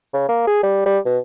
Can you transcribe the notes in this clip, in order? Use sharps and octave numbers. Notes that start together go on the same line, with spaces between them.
C#3
A#3
G#4
G3
G3
B2